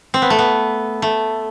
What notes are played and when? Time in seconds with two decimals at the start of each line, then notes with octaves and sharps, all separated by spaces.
0.14 C4
0.22 B3
0.30 A3
0.39 B3
1.02 A3